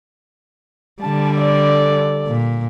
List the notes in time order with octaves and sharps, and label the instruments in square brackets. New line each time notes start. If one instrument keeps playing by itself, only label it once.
[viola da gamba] D3 G3 [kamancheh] A5
[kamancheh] A4 D5
[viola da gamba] A#2